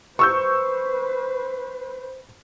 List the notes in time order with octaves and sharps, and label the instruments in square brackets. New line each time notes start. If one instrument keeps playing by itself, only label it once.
[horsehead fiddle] B4 C5 [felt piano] C#6 E6 G6